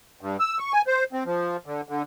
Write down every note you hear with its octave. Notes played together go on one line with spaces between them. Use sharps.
G2
E6
C#6
G#5
C5
C4
F3
D3
D3